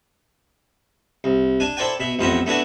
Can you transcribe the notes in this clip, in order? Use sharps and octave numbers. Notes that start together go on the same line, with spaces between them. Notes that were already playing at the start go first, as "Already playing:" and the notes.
C2
D4 G#5
E4 A4 C5 D5 G5 G#5
B2 E5
A1 F2 B3 C5 E5 A#5
A3 B3 D4 E4 F#4